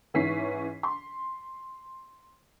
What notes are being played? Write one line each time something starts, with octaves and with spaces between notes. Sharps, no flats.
G#2 E3 C#4 B6 C7
C6